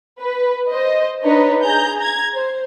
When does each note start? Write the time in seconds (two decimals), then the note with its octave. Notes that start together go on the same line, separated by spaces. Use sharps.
0.21 B4
0.70 C5 D#5
1.24 D4 D#4 B4 C#5 D#5
1.63 G#4 A#5 G6
1.98 A#5 G#6
2.34 C5